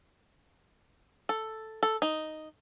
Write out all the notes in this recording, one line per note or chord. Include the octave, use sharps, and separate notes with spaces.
A4
A4
D#4